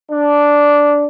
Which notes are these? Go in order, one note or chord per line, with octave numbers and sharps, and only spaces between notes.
D4